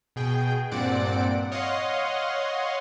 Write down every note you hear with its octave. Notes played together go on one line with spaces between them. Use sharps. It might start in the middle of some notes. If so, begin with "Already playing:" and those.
B2 G#4 G5
G2 A#2 C4 D5 F#5 D7
C#5 D#5 F5 F#5 C6